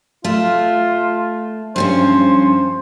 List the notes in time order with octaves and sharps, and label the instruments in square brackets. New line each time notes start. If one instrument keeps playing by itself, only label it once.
[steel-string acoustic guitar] A3 [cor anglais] F4
[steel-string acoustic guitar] G2 F3 C#4 [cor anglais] C5